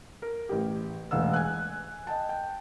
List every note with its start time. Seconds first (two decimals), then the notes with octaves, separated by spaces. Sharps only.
0.22 A#4
0.49 A1 G4
1.11 E1 A1 F5 F#5 E6
1.34 G#5 F#6
2.07 D#5 G5 A5
2.29 G5